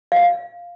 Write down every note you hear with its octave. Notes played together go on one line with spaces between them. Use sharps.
F5